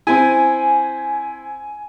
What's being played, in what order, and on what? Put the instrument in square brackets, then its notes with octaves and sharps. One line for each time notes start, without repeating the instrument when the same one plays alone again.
[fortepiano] C4 E4 [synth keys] G#5